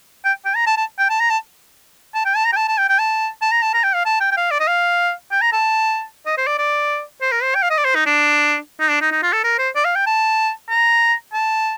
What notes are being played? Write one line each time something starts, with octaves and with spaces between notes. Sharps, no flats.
G5
G5
A#5
A5
A5
G5
A5
A#5
A5
A5
G5
A5
A#5
G5
A5
A5
G5
G5
A5
A5
A#5
A5
A#5
G5
F5
A5
G5
G5
F5
D5
D#5
F5
G5
A#5
A5
D#5
C5
D5
D5
C5
A#4
C5
G5
F5
D#5
D5
C5
D#4
D4
D#4
D4
D#4
D#4
F4
A4
A#4
C5
D5
F5
G5
A5
A#5
A5